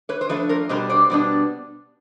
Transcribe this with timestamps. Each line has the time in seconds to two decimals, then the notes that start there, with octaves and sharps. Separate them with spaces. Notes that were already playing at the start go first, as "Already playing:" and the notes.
0.09 B4 C#5
0.21 C5
0.29 F3 A3 D4 B4 C#5
0.49 A#4 C5
0.69 B2 G3 B3 D4 A#4 C5
0.89 C5 D5
1.10 B2 G3 B3 D4